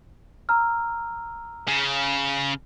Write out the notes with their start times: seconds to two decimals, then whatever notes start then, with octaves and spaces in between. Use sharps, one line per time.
0.49 A#5 E6 F6
1.68 C#3